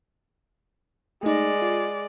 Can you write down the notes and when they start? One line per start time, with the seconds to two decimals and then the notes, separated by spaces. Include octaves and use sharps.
1.23 G#3 A3 D#4 D5
1.62 F4